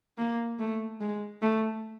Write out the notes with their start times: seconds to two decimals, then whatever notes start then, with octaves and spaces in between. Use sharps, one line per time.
0.18 A#3
0.59 A3
1.01 G#3
1.42 A3